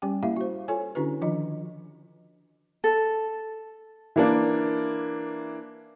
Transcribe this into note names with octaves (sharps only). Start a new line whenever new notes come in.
G3 C#4 G4 G5
A#3 E4 G4 E5 F5
F#4 C5
F4 A4 C#5 G#5
D3 C#4 D4 E4 F#4 B4
D#3 F3 D4 F4 D#5
A4
E3 A#3 D4